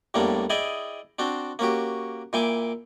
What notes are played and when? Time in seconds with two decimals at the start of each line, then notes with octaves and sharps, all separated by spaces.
0.14 E2 A2 G3 A#3 D4
0.50 E4 G#4 D5 D#5 G5 G#5
1.19 C4 D4 F#4 C5
1.59 A#3 C#4 F#4 G4
2.33 A#2 E4 G5 G#5 D6